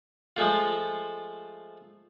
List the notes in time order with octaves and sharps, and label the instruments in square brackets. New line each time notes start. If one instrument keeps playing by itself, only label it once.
[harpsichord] F3 G#3 A3 F4